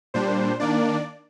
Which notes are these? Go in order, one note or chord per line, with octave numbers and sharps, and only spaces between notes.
A#2 G3 D4 C5
D#3 A#3 D4 D5